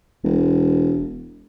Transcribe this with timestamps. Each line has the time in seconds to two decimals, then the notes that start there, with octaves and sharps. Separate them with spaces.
0.24 E1